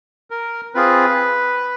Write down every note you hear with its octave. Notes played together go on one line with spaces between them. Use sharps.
A#4
C4 F4 G#4 B4